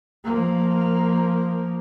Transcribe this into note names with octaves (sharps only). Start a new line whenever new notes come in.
F3 A#3